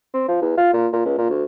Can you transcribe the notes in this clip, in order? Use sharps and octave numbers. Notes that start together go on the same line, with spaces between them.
C4
F3
E2
F4
A#2
A#2
C#2
A#2
D2